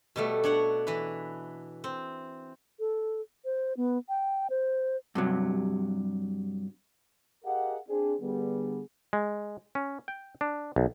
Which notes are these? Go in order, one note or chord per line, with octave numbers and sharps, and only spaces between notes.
B2 G3 A3
D4 C#5 F#5
E3 B4
C4
A4
C5
B3
G5
C5
G2 C3 F#3
G4 G#4 A#4 D#5 F5 F#5
C4 D4 G#4
D3 G3 B3 G#4
G#3
C#4
G5
D4
B1